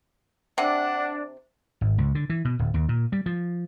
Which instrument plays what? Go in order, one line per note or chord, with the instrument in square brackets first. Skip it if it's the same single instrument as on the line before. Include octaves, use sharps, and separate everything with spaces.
[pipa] C3 [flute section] D4 [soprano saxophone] F#5
[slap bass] G#1
C#2
D3
E3
B2
D1
D#2
A#2
G3
F3